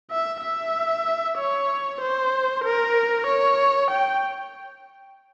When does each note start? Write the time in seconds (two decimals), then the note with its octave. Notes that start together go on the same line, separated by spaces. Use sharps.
0.11 E5
0.43 E5
1.38 C#5
2.01 C5
2.64 A#4
3.27 C#5
3.91 G5